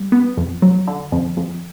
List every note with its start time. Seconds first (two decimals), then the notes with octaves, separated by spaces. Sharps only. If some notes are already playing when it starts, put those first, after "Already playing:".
Already playing: G3
0.12 B3
0.37 F2
0.62 F#3
0.88 D3
1.12 F2
1.37 F2